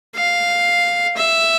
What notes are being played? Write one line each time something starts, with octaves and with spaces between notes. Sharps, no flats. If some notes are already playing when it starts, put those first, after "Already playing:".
F5
E5